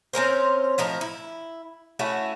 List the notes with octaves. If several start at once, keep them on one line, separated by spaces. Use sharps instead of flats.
C4 C#4 A#4 C5
A2 F3 D#4 A#4
E4
A3 C#4 E4 F#4